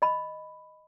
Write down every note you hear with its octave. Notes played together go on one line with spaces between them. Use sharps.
D#5 B5